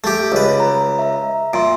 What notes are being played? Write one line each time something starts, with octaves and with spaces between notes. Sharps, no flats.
A3 G4
C#2 B4
A#5
E5 A#5
A#2 E5 C6 D7